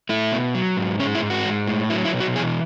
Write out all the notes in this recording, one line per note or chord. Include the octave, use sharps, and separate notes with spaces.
A3 E4
B2
F#3
G#2
G#3 C#4
E4
G#2
F#4
G#3
A2
F#3 E4
E4
B2
F#4
E3 G#4